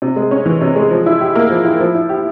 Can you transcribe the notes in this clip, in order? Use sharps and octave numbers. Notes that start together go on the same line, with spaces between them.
C3
G#3
C#4
E3
C3
G#3
F3
E4
G4
A#3
F3
E4
F3
E4
G4